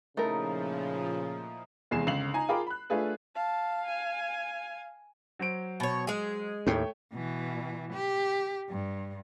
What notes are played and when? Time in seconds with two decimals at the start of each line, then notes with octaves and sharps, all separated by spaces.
0.17 A#2 C#3 F3 A3 D#4 E4 A#4
1.91 F1 E2 G#3 G#5 C7 E7
2.07 G1 C#2 C7 F7 F#7
2.34 D#4 G#5 A#5
2.49 F4 G#4 A#4 G5 B5 D6
2.67 B5 F#6
2.90 A3 D4 F4 G#4 B4
3.35 F5 A5
3.86 G#5
5.39 F#3 C5 D7
5.80 B2 C#5
6.07 G#3 G#4
6.67 D#2 A2 A3 C#5 G5
7.14 B2 E3
7.93 G4
8.69 G2